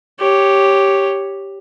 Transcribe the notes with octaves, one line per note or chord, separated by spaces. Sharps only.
G4 C#5